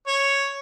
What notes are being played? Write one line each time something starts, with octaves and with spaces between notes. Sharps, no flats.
C#5